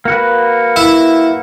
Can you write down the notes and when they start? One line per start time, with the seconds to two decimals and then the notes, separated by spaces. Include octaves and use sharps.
0.05 A#3 F#4 B4
0.76 E4